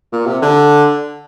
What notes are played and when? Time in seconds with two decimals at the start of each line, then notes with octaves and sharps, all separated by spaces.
0.12 A#2
0.26 C3
0.42 D3